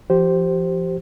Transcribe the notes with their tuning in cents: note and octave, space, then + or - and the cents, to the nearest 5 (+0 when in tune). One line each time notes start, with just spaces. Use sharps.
F3 -25 G4 -25 C5 +0